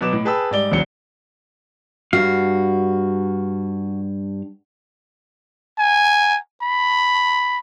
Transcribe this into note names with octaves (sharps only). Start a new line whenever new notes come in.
B2 F#3 B4 D6 E7
A2
G#4 B4 G5 A5 B5 E6
G#2 G3 D5 G7
A#1 D#2 C#3 F#3 C#7 G7
G2 F#4 F5
G#5
B5